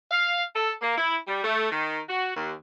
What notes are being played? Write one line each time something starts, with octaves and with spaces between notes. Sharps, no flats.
F5
A4
A#3
E4
G3
A3
D#3
F#4
D#2